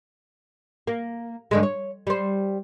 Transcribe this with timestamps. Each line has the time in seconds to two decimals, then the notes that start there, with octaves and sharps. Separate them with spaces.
0.87 A#3
1.51 G2 D3 G#3
1.63 C#5
2.07 G3 C5